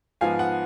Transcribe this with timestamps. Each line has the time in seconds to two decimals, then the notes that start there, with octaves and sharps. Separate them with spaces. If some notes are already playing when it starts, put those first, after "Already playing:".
0.21 G#2 F3 B3 F5 G#5
0.39 F#5